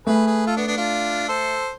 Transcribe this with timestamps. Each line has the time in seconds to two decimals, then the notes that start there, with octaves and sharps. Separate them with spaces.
0.06 A3 G#4 B4
0.26 G#4 B4
0.46 F4 A4
0.57 B3 D4
0.67 B3 D4
0.77 D4 F4
1.28 A4 C5